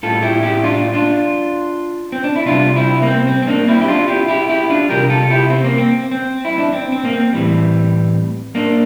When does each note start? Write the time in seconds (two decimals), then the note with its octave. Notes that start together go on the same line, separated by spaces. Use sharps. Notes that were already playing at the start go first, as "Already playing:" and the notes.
0.03 A2 G3 F4 A4
0.22 E4 G4
0.43 E4 G4
0.64 D4 F4
0.94 D4 F4
2.12 C4
2.24 D4
2.36 E4
2.46 C3 G3 D4 F4
2.76 C4 E4
3.02 A#3
3.07 C4
3.27 C4
3.42 C4
3.47 A#3 D4
3.68 C4 E4
3.81 G4
3.88 D4 F4
4.08 E4 G4
4.28 E4 G4
4.49 E4 G4
4.70 D4 F4
4.89 C3 G3 G4 A#4
5.10 F4 A4
5.30 E4 G4
5.50 C4
5.64 A#3
5.78 C4
6.11 C4
6.45 E4
6.58 D4
6.73 C4
6.92 C4
7.05 A#3
7.13 C4
7.33 A2 E3 G3
8.55 A#3 D4